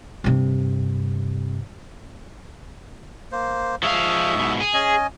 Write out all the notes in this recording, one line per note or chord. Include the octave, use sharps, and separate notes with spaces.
G2 C3
A#3 C5
F3 G#3 E5 F5 C#6 D#6
G#2 B2
G#4
C#4 D#5 G#5